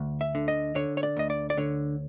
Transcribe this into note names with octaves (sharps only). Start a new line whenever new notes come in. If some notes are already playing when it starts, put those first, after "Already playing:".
Already playing: D2
E5
D3
D#5
D3 C#5
C#5
D5
D2 D#5
D5
D5
D3 C#5